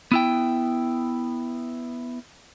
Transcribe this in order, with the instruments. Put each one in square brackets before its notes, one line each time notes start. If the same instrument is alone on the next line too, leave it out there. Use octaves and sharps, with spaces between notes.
[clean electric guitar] B3 E4 G5